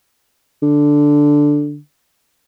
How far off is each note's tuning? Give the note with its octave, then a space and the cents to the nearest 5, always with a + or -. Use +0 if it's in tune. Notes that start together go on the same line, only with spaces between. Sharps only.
D3 +0